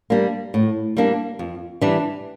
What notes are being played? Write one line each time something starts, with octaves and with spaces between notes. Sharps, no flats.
G3 A#3 D4
A2
G3 A#3 D4
F2
E3 G3 D4